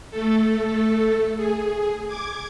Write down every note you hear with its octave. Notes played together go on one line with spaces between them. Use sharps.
A3 A4
G#4
D6 G#6